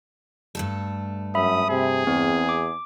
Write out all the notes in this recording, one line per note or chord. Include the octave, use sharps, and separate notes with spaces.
G2 A3 A4
F#2 E5 B5 D#6
C3 G#4
E2 C4
D6